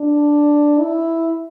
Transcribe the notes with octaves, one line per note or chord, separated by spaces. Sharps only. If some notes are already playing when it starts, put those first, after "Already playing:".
Already playing: D4
E4